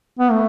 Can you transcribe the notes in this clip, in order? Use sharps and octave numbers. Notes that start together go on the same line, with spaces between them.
B3
A3